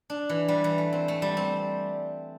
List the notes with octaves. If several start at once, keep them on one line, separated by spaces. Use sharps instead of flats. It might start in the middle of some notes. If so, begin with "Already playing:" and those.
D4
E3
G3
E3
A3
C4
A3
G3
C4